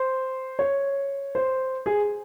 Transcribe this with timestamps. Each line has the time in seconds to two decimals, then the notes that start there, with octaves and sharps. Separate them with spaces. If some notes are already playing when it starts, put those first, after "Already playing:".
Already playing: C5
0.59 C#5
1.35 C5
1.86 G#4